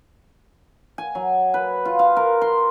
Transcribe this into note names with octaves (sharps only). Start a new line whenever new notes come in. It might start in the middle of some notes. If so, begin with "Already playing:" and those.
G#5
F#3
B4
F4
F5
A#4
C6